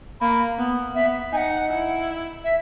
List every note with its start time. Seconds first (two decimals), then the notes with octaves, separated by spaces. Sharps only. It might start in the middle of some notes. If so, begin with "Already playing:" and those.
0.21 A#3 B5
0.59 B3
0.95 B3 E5
1.33 D#4 F#5 G#5
1.70 E4
2.44 E5